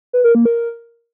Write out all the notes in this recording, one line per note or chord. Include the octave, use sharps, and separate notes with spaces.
B4
A#4
A#3
A#4